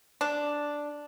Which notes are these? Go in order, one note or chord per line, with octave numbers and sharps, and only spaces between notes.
D4